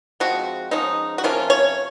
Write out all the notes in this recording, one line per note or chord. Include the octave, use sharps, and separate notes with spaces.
F3 G#3 C4 F#4
F3 G#3 C#4 D#4
F#4
C3 F3 A#3 C#4 F4
C#5